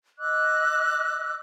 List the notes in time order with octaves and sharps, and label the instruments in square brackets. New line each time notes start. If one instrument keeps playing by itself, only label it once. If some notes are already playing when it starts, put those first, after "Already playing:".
[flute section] D#5 D6 E6 F#6